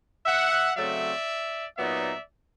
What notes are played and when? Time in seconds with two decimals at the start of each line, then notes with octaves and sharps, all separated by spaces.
0.26 E5 F#5
0.76 C#3 F#3 A3 C4 D5 E5
1.77 A#2 F#3 B3 D#4 D5 E5